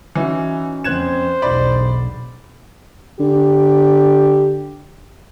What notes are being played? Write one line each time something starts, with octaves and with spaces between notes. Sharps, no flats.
E3 C#4 D#4 F#4
F2 B3 C#4 C5 F#6 G#6 E7
E1 B1 D#4 D5 B5
D3 G4